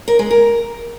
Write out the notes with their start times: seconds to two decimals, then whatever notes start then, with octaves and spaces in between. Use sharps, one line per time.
0.08 A#4
0.19 G#3
0.31 A#4